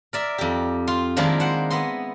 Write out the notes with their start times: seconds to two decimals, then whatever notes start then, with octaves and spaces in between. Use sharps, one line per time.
0.13 A#4 D5 E5
0.38 F2 G4
0.87 F4 C6
1.17 D#3 F3 G#3 A#3 D4 E4
1.40 C5 F#5
1.70 B3 E4 D#5 C6